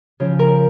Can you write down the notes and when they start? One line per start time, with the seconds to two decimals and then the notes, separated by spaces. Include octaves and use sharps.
0.20 C#3 F3
0.39 A#4